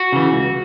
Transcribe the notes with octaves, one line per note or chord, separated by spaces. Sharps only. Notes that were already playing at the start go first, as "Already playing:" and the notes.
Already playing: F#4
C#3 E3
C#2